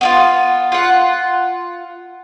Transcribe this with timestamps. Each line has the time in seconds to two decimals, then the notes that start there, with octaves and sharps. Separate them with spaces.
0.01 B3 D4 F4
0.72 F4 F#5